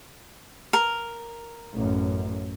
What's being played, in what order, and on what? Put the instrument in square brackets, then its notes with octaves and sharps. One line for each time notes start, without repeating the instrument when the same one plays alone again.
[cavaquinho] A#4
[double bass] A1 F#2